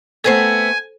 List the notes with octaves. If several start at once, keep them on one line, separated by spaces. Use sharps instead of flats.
A3 B3 C4 A4 C5 G#5